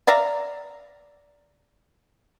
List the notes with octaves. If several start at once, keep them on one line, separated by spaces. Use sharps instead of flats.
D5 E5 F5 A#5